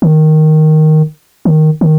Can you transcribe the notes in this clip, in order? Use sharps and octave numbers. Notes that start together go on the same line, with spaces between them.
D#3
D#3
D#3